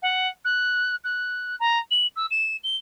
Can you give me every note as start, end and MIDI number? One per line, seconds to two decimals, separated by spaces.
0.02 0.28 78
0.45 0.96 90
1.04 1.56 90
1.60 1.79 82
1.91 2.07 102
2.16 2.26 88
2.31 2.57 100
2.64 2.76 103